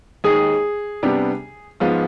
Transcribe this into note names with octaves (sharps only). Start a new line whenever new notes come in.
D#2 D#3 G#3 G#4
C3 G3 B3 D4 G4
G#2 F3 G#3 B3 F4